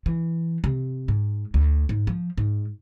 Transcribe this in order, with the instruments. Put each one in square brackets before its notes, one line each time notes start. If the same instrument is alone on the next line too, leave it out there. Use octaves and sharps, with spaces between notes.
[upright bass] E3
C3
G#2
D2
G#2
F3
G#2